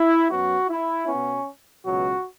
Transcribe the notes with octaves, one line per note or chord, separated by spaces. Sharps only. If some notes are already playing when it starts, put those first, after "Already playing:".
Already playing: E4
F#2 F#3 B3 F#4
E4
B2 B3 C#4
C#2 B2 F#3 F#4